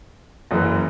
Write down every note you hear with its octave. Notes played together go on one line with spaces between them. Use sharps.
F#1 F#2 E3